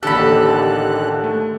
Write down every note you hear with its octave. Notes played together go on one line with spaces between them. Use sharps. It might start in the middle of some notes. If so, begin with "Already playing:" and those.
A1 D#2 D3 G4 A4 B5 F#6
A3